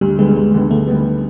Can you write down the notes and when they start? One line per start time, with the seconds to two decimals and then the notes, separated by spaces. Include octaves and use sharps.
0.01 D2 G3
0.19 D3 G3 G#3 B3
0.37 D2 G#3
0.54 D3 G3 B3
0.71 D2 A3
0.87 D3 G3 B3